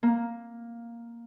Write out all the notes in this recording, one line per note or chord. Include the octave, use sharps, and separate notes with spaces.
A#3